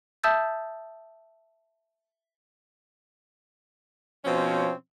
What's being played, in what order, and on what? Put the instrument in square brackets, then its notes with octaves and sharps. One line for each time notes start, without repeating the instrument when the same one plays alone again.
[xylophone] E5 A5 D#6 E6 G6 A6
[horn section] B2 F3 C4 C#4 C#5